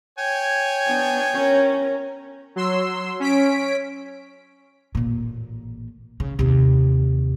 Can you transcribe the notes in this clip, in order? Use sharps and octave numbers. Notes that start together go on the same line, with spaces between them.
C#5 G5 G#5
B3 D4
C#4 A#4
F#3 C6 E6
C#4 B6 D7
A1 A#2
C#3
D#2 C3